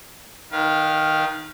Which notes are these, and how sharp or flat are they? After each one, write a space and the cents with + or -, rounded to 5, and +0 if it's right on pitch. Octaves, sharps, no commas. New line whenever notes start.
D#3 +0 B4 -40 F5 +0